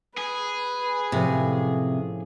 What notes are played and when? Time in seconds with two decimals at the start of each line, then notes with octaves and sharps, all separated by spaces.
0.17 G#4 B4
1.12 A2 C3 F3 C#4